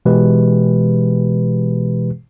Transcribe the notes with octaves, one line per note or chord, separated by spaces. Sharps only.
B2 E3 G#3 G4 B4